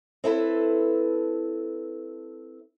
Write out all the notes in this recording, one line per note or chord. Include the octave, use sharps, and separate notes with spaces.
C4 E4 A4 B4